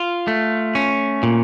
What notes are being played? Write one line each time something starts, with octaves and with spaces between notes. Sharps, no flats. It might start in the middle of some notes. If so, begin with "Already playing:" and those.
Already playing: F4
A3
C#4
A#2